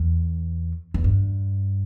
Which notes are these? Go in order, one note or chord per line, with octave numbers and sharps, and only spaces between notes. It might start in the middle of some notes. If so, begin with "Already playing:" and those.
Already playing: E2
E2
G2